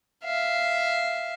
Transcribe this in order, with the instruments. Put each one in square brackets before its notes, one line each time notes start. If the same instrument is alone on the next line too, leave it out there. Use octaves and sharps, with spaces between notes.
[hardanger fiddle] E5 F5